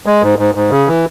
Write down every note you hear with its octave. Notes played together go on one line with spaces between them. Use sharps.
G#3
G#2
G#2
G#2
C#3
E3